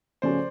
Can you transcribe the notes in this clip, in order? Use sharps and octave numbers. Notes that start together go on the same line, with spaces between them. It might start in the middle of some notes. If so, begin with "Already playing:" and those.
C#3 F3 A3 C#4 F#4 C5 D5